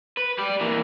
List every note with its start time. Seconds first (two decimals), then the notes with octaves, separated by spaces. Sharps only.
0.17 B4
0.38 G3 D5
0.61 E3 A#3